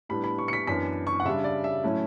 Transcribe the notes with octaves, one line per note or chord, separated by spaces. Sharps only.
A2 G3 B3 D4 B5
B5
C#6
C#7
B6
F#2 E3 B3 D4 B6
C#6
F#5
C#3 G3 D4 E5
D5
E5
A2 F#3 A3 C#4 E4